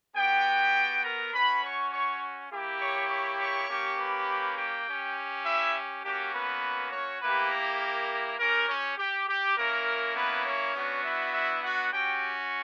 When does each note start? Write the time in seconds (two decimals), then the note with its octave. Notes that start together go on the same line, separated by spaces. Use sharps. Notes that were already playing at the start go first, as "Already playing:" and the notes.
0.16 B3 F#4 G4 G5
1.04 A#4 A#5
1.33 C#4 F#4 B4 B5
1.63 C#5 C#6
1.92 C#5 C#6
2.51 A#3 E4 G4
2.81 C#5 C#6
3.09 C#5 C#6
3.39 C#5 C#6
3.69 A#3 C#4 G4
3.98 B4 B5
4.57 G4 G5
4.87 C#4 G4
5.45 E4 E5
6.04 A#3 C#4 F#4 G4
6.33 B3 B4
6.92 C#4 C#5
7.22 A#3 B3 E4 G4 B4
7.51 A#4
7.81 A#4
8.39 C#4 G4 A#4
8.69 C#4 C#5
8.98 G4
9.28 G4
9.57 A#3 C#4 E4 A#4
10.16 B3 B4
10.45 C#4 C#5
10.75 B3 D4 F#4
11.04 E4 E5
11.33 E4 E5
11.63 F#4 F#5
11.92 C#4 F#4 G4 G5